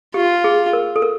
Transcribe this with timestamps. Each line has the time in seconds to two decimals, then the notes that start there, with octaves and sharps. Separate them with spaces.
0.14 F4 G4
0.44 G#4
0.73 A#4
0.96 A4
1.02 A#4